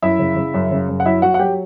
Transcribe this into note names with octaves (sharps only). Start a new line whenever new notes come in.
F#2 E4 E5
C#3
C#3
F#2
C#3
F#2
F#5
F#3 E4 E5
F#3 F#4 F#5
F#5
F#3 G4 G5